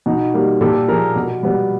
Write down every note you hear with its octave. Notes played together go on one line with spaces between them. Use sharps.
B2 D#4
G3 A#3
A#2 G4 A4
F3 A#3 G#4 A#4
B2
G3 B3